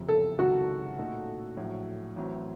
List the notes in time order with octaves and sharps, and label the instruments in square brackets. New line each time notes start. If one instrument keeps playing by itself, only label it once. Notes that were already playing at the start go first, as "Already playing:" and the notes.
Already playing: [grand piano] F#1 F2 C3 F3
[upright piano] A4
[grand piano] C#2 C3 D#3 F#3 [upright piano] F#4
[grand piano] A#2 A3 D#4 A4
A#1 A2 F#3
A1 A2 F#3 C4